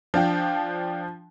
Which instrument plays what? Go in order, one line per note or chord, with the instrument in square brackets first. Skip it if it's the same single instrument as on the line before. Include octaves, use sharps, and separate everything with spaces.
[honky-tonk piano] F3 [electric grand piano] D4 F5 G5